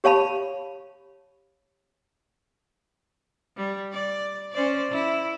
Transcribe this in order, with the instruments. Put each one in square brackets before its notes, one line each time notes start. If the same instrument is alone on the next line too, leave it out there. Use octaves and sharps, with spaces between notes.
[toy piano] G4 C#5 F5 A5 B5
[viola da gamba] G3
D5
C#4 C5 D5
E4